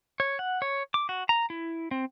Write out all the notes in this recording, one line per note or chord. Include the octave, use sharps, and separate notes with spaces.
C#5
F#5
C#5
D6
F#4
A#5
E4
C4